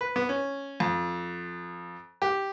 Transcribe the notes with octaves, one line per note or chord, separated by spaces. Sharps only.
B4
B3
C#4
F2
G4